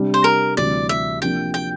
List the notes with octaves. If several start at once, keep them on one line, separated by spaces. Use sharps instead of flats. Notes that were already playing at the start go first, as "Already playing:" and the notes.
Already playing: C3 G3 D4
C5
A#4
D2 C3 E3 G3 D5
E5
C3 F3 A#3 D4 G5
G5